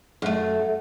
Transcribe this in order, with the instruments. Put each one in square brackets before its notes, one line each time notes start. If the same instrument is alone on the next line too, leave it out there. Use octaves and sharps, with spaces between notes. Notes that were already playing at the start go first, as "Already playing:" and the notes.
[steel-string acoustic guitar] F#2 A3